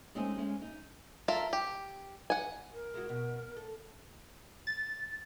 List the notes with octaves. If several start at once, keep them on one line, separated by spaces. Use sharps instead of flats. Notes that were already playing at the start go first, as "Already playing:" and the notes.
G#3 A3 C4 C#4 D#4 G#4
G#3 C#4
D#4
F4 A4 A#4 E5
G4
F#5 G#5
A#4
G#3 E4 F#4
B2
A4
A6